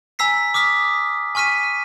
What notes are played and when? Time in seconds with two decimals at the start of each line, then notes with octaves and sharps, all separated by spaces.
0.19 G#5 A#5 E6 B6 C7
0.54 D6 D#6 F6 B6
1.35 G#5 C#6 F6 B6 D#7